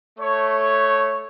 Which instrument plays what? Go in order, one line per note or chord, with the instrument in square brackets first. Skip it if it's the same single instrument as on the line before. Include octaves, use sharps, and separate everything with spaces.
[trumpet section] A3 C#5